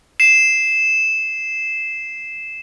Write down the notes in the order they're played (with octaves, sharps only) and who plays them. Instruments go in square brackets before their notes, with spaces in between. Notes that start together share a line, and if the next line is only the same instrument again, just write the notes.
[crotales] C7 E7